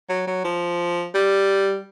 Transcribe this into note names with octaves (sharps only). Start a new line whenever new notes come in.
F#3
F#3
F3
G3